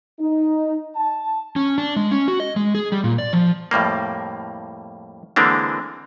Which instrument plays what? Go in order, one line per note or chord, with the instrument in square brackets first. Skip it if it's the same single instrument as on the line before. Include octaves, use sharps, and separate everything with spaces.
[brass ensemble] D#4
A5
[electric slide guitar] C#4
D4
G#3
C#4
F#4
D#5
G#3
G#4
G3
A#2
D5
F3
[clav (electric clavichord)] F2 A2 G3 A#3
D3 E3 G#3 A#3 C4 D4